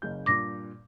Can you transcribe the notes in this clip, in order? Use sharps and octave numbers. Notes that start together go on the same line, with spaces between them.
F#1 C#3 G6
G2 A#2 D6 A#6